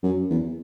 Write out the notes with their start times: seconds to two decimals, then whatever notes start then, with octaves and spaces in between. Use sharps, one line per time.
0.03 F#2
0.30 E2